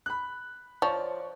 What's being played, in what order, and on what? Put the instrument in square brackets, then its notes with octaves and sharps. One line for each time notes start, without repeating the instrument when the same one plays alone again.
[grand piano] B5 F#6
[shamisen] F3 [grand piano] C#5 D5 C#6